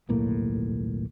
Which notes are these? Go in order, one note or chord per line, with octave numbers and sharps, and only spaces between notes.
D#1 B1 A2 A#3